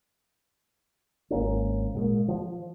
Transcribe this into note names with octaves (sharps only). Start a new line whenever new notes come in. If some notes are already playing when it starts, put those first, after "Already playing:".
G#1 A#3 C#4
A#2 G#3 A#3
F3